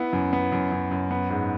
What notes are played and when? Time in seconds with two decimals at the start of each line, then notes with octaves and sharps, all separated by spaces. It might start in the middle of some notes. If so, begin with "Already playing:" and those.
Already playing: B3 E4
0.13 F#2
0.33 B3
0.52 F#2
0.72 F#2
0.91 F#2
1.11 B3
1.30 G#2